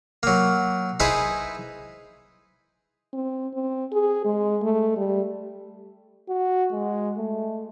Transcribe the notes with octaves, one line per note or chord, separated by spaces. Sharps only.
F#3 A#3
D#4 E4 G#4 B4 C5 D#5
C4
C4
G#4
G#3
A3
G3
F#4
G#3
A3